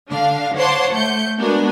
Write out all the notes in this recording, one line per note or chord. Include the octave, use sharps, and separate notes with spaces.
D3 D4 F5
C5 C#5 F#5 A5 C6 D6
A3 G6 C#7
G#3 B3 D4 F#4 A#4 G#5